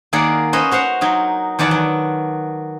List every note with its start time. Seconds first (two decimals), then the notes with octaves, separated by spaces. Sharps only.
0.13 D#3 A#3 G#4 A#4 D5 F#5
0.53 C#4 B4 C5 D#5
0.71 F#4 C5 F5 F#5
1.01 F#3 D#4 A#4
1.59 E2 D#3 B4 D5 F#5 A5
1.71 F#3